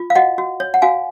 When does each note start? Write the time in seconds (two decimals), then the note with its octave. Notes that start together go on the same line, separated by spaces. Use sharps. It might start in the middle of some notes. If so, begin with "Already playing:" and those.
Already playing: F4
0.10 F5
0.15 F#4 D#5 F#5
0.38 F#4
0.60 C#5
0.74 F#5
0.82 F#4 F5 G#5